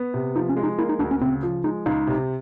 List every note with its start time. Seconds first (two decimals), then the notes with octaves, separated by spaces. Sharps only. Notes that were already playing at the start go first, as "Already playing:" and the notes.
Already playing: B3
0.14 C3
0.35 F3 D#4
0.49 C#4
0.57 G#3
0.63 D#4
0.78 A#3 E4
0.89 D#4
0.99 D2 D4
1.11 C#4
1.21 C#3 C4
1.43 F3
1.64 G#3 D#4
1.86 C#2 D#4
2.07 C3